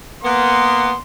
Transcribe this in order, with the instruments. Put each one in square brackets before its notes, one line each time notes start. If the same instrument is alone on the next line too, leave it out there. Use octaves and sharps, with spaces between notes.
[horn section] A#3 B3 [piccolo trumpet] C6